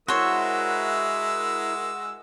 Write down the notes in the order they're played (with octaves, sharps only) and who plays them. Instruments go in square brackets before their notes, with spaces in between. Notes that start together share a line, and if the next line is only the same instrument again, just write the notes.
[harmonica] G#3 E6 [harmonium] E4 A#4 E5 [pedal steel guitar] F#4 [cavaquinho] C5 C#5